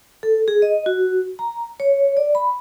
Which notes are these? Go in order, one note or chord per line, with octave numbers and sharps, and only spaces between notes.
A4
G#4
D#5
F#4
A#5
C#5
D5
B5